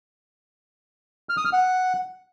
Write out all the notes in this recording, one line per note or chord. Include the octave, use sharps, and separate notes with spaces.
F6
D#6
F6
F#5